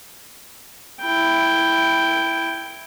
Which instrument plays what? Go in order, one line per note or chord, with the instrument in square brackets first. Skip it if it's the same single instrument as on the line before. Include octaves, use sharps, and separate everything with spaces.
[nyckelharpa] E4 G5